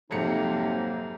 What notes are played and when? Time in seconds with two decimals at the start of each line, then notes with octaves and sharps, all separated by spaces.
0.11 F2 G#2 C3 F#3 A#3 D#4 C#7